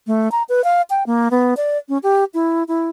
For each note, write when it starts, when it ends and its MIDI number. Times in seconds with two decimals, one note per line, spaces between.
0.07 0.31 57
0.32 0.43 82
0.49 0.64 71
0.64 0.82 77
0.90 1.03 79
1.06 1.28 58
1.31 1.54 59
1.57 1.78 74
1.89 1.98 61
2.03 2.24 67
2.34 2.63 64
2.68 2.90 64